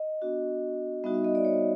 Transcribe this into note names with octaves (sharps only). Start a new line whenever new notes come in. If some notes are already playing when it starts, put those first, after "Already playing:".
Already playing: D#5
B3 D4 F#4
G3 B3 D#4 F#4 E5
E5
D#5
D5
C#5